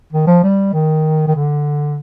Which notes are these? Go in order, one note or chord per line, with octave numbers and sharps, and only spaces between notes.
D#3
F3
G3
D#3
D#3
D3